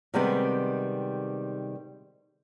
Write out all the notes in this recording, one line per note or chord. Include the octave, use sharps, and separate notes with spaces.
C3 D#3 G3 G#3 B3 C4